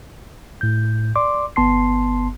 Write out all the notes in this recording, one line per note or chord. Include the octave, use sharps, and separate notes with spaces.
A2 G6
D5 C6 D6
G1 B3 A5 C6 C7